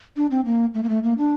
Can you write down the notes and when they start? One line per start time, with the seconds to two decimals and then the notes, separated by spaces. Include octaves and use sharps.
0.16 D4
0.31 C4
0.45 A#3
0.74 A3
0.83 A#3
0.89 A3
1.03 A#3
1.18 D4